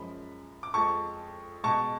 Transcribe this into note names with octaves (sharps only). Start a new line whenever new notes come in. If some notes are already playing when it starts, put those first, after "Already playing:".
Already playing: F#2 F3 G#3 B5
D6
F2 F3 G#3 A5 C#6
B2 G#3 A5 C#6